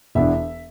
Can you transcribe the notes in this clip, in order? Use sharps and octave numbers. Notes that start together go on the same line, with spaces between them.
E1 E2 E3 D4 E5